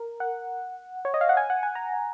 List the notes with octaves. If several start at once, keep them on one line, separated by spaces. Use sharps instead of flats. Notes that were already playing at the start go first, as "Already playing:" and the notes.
Already playing: A#4
F#5
C#5
D#5
F5
F#5
G#5
F#5
G#5
A#5